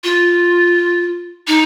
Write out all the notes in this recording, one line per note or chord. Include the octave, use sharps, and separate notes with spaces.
F4
D#4